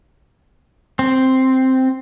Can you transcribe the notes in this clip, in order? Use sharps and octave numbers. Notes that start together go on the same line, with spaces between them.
C4